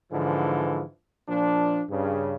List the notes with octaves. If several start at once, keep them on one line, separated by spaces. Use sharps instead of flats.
G#2 D3 E3 F3
A#2 F3 D4
G2 C#3